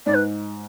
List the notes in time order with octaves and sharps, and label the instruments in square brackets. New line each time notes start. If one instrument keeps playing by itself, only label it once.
[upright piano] G#2 [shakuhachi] D5
[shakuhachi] B4